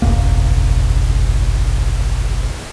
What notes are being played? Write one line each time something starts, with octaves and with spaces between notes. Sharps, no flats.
F#1 B1 E2 A#3